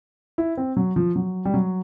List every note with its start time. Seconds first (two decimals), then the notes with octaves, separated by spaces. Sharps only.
0.38 E4
0.57 C4
0.77 F#3
0.96 F3
1.16 F#3
1.45 G3
1.54 F#3